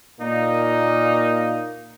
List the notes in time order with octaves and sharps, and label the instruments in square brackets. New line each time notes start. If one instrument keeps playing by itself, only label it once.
[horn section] A#2 A#3 D#4